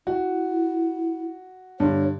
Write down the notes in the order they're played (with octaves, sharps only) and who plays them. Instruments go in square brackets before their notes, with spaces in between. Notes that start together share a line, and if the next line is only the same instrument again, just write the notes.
[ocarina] E4 [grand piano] F#4
[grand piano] G2 D3 [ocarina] C#5